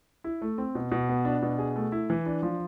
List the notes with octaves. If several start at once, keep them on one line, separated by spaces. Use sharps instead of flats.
E4
A3
C4
B2
B2
B3
D4
B2
G#4
A3
E4
E3
D4
F3